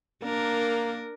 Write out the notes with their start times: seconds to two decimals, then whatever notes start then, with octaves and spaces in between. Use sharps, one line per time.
0.23 A#3 D4 A#4